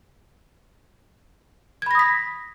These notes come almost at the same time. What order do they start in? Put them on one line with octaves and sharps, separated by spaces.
G#6 B5 A#6 D#6 B6